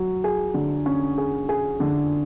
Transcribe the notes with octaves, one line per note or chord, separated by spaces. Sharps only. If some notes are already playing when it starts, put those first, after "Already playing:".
Already playing: F#3
G#4
D3
C#4
G#4
G#4
D3